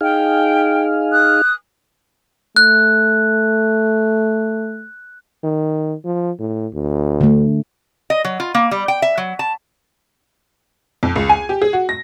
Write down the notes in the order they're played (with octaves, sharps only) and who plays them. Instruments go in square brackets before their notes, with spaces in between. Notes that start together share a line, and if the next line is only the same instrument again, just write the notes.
[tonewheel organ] D#4 G#4 F5 [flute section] G5
[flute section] D#6 F#6
[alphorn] A3 [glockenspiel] F#6
[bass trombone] D#3
F3
A2
D2
[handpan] D3 A3
[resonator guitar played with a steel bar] D#5
F#3
F4
A#3
G3
G5
E5
F#3
A5
[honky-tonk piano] F2
C#2
G#5
G4
G#4
F#4
A#6